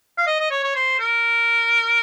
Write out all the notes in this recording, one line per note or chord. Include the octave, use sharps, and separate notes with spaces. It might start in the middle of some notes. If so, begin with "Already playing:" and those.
F5
D#5
D#5
C#5
C#5
C5
A#4